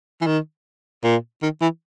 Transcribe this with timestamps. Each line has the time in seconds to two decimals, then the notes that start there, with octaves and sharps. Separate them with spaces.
0.21 E3
0.27 D#3
1.04 A#2
1.42 D#3
1.62 E3